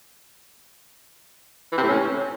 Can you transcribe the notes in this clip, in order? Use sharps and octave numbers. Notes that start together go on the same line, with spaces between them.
E3
C3
A2
C#4